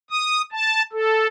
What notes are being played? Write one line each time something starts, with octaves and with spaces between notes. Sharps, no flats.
D#6
A5
A4